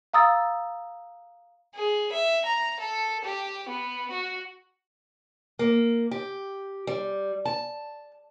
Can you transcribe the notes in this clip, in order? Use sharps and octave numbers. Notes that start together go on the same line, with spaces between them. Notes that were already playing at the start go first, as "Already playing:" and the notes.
F5 A#5 D#6 E6 A6
G#4
E5
A#5
A4
G4
B3
F#4
A#3
G4
G3
A5